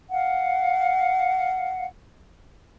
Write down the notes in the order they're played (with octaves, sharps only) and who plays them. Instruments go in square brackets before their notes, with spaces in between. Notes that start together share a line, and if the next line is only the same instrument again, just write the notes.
[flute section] F5 F#5